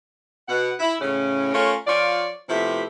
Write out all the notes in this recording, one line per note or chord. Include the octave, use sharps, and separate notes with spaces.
B2 F#5
E4
A2 C#3 C#4
A3 C#4 F4 A#4 C#5
F3 F4 C#5 D5
C3 F3 A3 B3 E4 G4